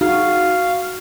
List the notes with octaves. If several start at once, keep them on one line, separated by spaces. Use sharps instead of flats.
D#4 F#4 G#4 F5